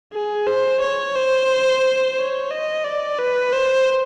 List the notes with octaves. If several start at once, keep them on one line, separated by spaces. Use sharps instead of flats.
G#4
C5
C#5
C5
C#5
D#5
D5
B4
C5